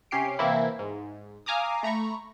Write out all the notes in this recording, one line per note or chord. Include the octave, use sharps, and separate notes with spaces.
C3 C#4 G4 C7 D7
C3 E3 A#3 C4 E4
G#2
F5 G#5 A#5 D6 D#6
A3 A#5 B5 C#6